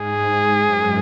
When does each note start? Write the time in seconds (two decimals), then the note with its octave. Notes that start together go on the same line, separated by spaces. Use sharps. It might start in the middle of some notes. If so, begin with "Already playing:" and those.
Already playing: G#2 G#4
0.66 F#2